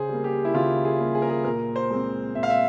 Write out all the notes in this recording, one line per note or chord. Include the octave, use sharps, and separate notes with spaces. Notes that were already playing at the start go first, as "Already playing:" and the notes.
Already playing: C#3 G#4 C5
G3 A#3
G4
E4
C#3 F4
G#4
G3 A#3
G#4
A#4
G#4
A#2 A#4
C5
G#3 C4
A#2 E5
F5
E5